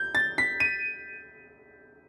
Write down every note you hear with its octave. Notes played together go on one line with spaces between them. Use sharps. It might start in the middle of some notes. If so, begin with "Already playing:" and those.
Already playing: G6
A6
B6
D#7